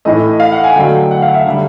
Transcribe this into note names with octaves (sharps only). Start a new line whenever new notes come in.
A2 E3 A3 D#5
F5
F#5
G#5
D3 F#3 A3 G5
F#5
F5
E5
D3 G3